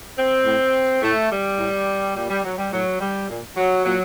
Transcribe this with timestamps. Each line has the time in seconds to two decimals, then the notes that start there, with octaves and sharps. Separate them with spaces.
0.17 C4
0.45 A2
1.02 A2 A3
1.30 G3
1.59 A2
2.15 A#2 G3
2.30 G3
2.44 F#3
2.58 G3
2.72 A2 F#3
3.00 G3
3.29 A#2
3.57 F#3
3.85 A#2 F#3